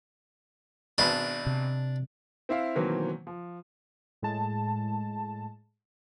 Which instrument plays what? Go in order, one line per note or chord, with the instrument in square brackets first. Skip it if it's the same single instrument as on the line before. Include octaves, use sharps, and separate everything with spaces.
[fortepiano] G#1 B2 B5 [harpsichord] D4
[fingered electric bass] C3
[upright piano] C4 E4 E5 F5
B2 D#3 E3 F#3 A#3 C4
F3
[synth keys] A2 G#3 A5